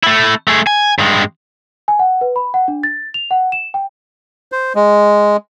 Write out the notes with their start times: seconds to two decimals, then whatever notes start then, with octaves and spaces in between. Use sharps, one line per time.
0.03 A3 E4
0.48 A3 G#4
0.67 G#5
0.99 G2 G#3
1.88 G#5
1.99 F#5
2.21 B4
2.36 B5
2.54 F#5
2.68 D4
2.83 A6
3.14 F7
3.31 F#5
3.52 E7
3.74 G5
4.52 C5
4.75 G#3